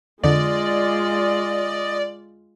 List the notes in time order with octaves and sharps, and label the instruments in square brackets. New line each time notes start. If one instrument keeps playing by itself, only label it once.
[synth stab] F2 D3 [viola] G#3 F4 [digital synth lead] D5 [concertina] D#5